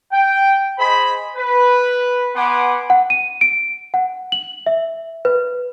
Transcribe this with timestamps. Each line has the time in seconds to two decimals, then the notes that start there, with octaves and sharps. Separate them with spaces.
0.12 G5
0.78 G#4 C5 D#5 B5
1.36 B4
2.34 B3 F#5 G#5 C6 D6
2.90 F#5
3.10 D#7
3.41 D7
3.94 F#5
4.32 F#7
4.66 E5
5.25 B4